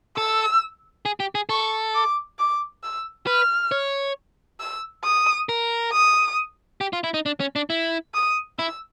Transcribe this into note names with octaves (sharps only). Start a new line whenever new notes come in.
A4 E6
G#4
G4
G#4
A4 C#6
D6
D6
E6
B4 F6
C#5
E6
D#6
A#4
D#6
G4
F4
E4
D#4
D4
C#4
D4
E4
D#6
E4 E6